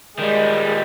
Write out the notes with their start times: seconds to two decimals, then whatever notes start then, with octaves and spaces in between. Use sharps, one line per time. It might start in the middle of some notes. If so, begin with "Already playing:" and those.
0.19 D#3 G3 G#3